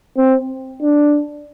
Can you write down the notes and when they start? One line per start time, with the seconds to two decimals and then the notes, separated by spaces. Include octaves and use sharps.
0.17 C4
0.82 D4